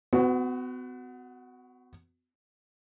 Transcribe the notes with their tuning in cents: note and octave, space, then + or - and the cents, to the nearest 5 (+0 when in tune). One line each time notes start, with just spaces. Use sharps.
B3 +40 F#4 +0